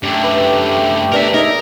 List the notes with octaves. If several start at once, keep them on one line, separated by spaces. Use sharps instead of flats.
F#2 D3 A3 G4
B4
B3 D4 A#4 E5
D#4 G#4 A#4 D5 E5